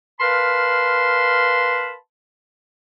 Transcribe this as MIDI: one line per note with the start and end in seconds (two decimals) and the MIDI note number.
0.20 1.94 70
0.20 1.94 71
0.20 1.94 77
0.20 1.94 81
0.20 1.94 83
0.20 1.94 84